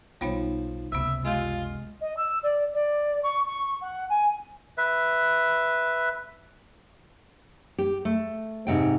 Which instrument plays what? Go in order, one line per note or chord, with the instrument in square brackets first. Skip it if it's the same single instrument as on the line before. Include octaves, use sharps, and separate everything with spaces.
[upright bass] B1 D#4 [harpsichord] F3 [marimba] G3 B3 C#5
[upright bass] F#1 C#2 [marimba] C3 B3 [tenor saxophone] E5
[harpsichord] G#3 [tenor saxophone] F4 [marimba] G4 F5 E6
[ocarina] D#5
E6
D5
D5
C#6
C#6
F#5
G#5
[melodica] B4 E5
[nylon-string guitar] G4
A3
G#2 C3 G5